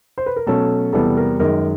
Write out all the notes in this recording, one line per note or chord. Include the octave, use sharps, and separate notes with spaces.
C5
B4
A#4
B2 F#3 A3 C#4 A4
E2 C3 E3 G3 B3 A4
A#4
F#2 D#3 G#3 A#4